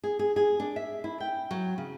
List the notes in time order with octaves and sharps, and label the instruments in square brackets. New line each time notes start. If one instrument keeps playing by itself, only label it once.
[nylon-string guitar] G#4
G#4
G#4
D4
E5
E4
G5
F#3
C#3